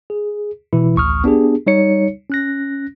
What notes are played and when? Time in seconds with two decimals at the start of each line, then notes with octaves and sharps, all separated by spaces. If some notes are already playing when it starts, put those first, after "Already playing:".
0.10 G#4
0.73 B2 E3 E4
0.95 A1 D2 C#6 D#6 F6
1.24 B3 D4 G4 G#4
1.67 G3 D#4 C#5 C#7
2.30 C#4 F#6 A#6